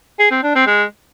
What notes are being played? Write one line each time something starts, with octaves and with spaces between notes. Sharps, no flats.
G#4
C4
D4
C4
G#3